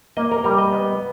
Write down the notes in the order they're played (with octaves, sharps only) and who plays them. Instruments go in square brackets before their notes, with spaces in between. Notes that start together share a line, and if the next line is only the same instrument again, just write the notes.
[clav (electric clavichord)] A#3 D#5
A#4
G3 A#4
D#5
B3